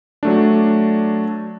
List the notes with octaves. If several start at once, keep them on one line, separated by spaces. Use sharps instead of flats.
F#3 A3 D4